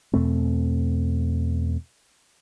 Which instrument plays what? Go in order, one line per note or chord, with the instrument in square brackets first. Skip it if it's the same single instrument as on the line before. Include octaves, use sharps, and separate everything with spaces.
[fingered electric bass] E2 B2 A3 C4